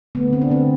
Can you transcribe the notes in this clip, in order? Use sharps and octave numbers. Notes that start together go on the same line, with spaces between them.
D3 A3 B3
C4
D4
D3 A3 C4